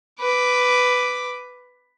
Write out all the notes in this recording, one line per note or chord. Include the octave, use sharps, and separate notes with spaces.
B4 D6